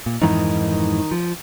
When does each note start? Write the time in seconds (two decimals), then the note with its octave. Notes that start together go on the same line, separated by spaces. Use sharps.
0.06 A#2
0.22 F2 G#2 D#3 E3 D#4
1.11 F3